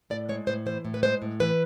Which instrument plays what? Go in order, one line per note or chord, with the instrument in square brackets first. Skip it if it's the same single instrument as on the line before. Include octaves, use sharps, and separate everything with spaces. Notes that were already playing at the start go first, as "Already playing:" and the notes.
[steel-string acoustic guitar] A2 D5
G#3 C#5
A2 C5
E3 C5
A2
B4
G#3 C5
A2
E3 B4